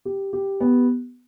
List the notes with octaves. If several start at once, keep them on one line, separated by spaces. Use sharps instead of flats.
G4
G4
B3